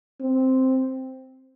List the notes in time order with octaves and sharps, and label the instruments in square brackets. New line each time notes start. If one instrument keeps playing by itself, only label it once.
[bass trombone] C4